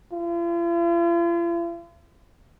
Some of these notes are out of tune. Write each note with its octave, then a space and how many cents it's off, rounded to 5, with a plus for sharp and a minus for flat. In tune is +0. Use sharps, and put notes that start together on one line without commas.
F4 -45